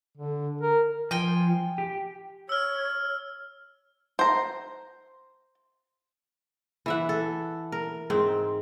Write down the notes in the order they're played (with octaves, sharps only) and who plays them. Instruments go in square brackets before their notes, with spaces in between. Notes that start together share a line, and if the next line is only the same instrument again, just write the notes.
[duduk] D3
A#4
[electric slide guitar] F3 [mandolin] G5 G#5
[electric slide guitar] G4
[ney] C#5 [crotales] E6 F6
[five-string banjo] C5 A#5
[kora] E3 E5 F#5
A4
A#4
G#2 C4